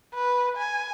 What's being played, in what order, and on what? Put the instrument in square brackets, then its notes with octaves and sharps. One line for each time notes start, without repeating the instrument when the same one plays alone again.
[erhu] B4
G#5